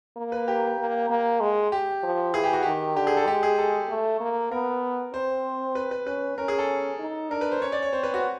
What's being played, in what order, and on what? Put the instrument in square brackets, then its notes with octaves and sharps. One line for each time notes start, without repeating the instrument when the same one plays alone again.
[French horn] A#3
[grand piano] B4
G4
[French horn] A#3
A#3
G#3
[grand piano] G4
[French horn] F3
[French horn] E3 [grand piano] G#4
[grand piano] G4
F#4
[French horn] D#3 [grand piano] G4
[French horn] D3 [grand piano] G4
[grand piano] G#4
A4
[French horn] G#3 [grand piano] G4
[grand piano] G#4
A4
[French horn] A3
A#3
[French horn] B3 [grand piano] A#4
[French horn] C4 [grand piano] C5
[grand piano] B4
B4
[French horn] C#4 [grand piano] B4
[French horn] C#4 [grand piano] A#4
[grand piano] G#4
A4
[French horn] D#4
[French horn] D4 [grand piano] A#4
[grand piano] B4
C5
[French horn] C#4 [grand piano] C#5
[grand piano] D5
C#5
[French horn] C4 [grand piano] C5
[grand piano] B4
F#4